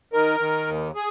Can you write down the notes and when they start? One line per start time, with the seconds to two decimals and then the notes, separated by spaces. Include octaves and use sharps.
0.13 D#3 A#4
0.40 D#3
0.67 D#2
0.95 G#4